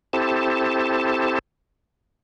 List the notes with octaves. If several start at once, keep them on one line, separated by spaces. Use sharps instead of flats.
C4 E4 G4 A4 C5 A5